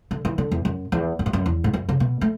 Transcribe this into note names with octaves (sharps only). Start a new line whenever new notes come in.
D3
E3
D3
E2
F#2
E2
F#2
G#2
F#2
E2
G#2
F#2
C#3
B2
A3